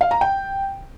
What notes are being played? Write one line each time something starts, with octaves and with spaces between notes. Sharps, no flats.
F5
A#5
G5